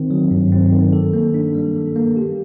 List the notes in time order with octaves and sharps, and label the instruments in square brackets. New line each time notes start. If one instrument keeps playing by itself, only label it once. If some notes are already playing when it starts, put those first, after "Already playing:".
Already playing: [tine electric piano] D#3 C4
F#3
G2
C4
D#3
A4
A#3
D4
G3
A4
A#3
G4